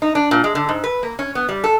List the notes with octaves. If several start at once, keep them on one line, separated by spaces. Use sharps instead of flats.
D#4
D4
A#2
G#3
D3
G#2
B4
A#3
C#4
B3
G3
A4